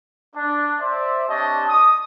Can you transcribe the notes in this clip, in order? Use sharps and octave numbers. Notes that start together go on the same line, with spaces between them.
D4
C5 D5 E5
C4 D4 G4 C#5 D#5 A5
D#6